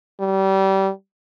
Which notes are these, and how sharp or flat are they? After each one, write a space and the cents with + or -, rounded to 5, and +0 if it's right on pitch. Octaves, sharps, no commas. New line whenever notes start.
G3 -25